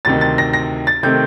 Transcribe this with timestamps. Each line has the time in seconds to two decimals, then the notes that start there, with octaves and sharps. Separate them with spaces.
0.05 D2 C3 D#3 A6
0.21 A6
0.38 A#6
0.53 A#6
0.87 A6
1.03 C3 D#3 A3 C4 G6